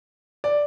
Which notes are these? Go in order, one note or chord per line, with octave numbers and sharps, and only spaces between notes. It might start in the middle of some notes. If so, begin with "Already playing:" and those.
D5